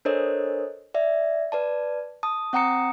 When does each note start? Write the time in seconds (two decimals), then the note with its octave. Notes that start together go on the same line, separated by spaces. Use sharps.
0.05 D4 A4 A#4 C5 C#5 D#5
0.94 D5 E5
1.52 B4 D5 A5
2.23 A5 D#6
2.53 C4 F#5 G5 A#5 D#6 C#7